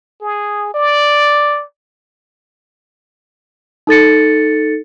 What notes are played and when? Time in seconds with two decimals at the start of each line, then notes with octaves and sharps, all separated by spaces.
0.21 G#4
0.74 D5
3.87 D#4 A4 A6 C#7